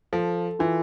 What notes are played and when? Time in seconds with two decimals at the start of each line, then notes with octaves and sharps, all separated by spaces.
0.13 F3 A4
0.59 E3 F4